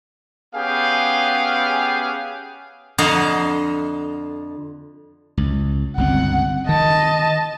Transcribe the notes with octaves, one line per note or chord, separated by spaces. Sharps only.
B3 C#4 G4 G#4 F5 G5
F2 D3 D#5 F5 F#5 A#5
C#2
G1 C#2 C4 F#5
D#3 D#5 A5